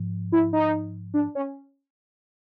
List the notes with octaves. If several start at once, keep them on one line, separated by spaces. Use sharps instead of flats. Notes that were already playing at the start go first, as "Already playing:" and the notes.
Already playing: G#2 F3
E4
D#4
D4
C#4